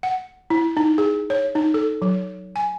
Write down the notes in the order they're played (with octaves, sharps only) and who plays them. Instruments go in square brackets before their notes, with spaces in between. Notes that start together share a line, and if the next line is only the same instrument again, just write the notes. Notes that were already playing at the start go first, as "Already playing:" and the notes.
[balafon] F#5
E4
D#4
G#4
C#5
D#4
A4
F#3
G#5